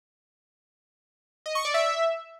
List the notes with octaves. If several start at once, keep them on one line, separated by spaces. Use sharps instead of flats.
D#5
C#6
D5
E5